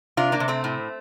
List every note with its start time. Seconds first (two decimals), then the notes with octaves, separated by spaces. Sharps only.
0.17 C3 D4 F4
0.32 A#3 D4
0.40 C3
0.48 A3 C4
0.64 A2